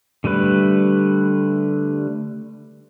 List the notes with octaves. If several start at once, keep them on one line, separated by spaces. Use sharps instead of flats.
D3 G3 A3 B4